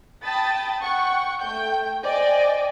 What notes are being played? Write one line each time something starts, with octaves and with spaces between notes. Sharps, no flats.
G5 A5 B5 D#6 A6
F#5 G5 C#6
A3 G5 G6
C5 D5 D#5 G5 G#5